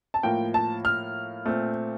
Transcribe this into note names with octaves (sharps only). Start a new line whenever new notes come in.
A5
A2 F3 A#3 G5
A5
F6
A#2 A3 C4